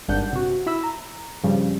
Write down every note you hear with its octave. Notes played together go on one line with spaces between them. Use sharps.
G#1 G2 D4 F#5 G6
C3 F#4
E4 B5 E6
A#5
G2 C#3 F3 G3